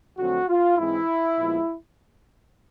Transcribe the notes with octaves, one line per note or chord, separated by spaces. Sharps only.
F2 D3 F#3 A3 C4 F#4
F4
G#2 E3 G#3 C4 E4
A#2 F3 G#3 B3